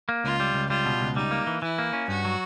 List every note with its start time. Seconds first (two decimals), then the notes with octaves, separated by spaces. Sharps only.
0.09 A#3
0.24 C#2 F4
0.40 G3
0.54 C#2
0.70 G3 F4
0.85 B2
1.01 C#2
1.16 G3 D#4
1.31 A#3
1.47 E3
1.62 E3 E4
1.78 A#3
1.93 C#4
2.08 G2 F#4
2.25 F#3